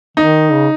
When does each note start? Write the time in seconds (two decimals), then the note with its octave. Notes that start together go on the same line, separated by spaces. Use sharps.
0.17 D#3 D#4
0.52 C#3